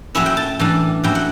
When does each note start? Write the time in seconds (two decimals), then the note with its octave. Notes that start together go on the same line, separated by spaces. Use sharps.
0.15 A2 F#3 C#4 E4 E5
0.26 G5
0.37 A5
0.59 A2 E3 G3 D4
1.04 A2 F#3 C#4 E4 G5
1.15 F#5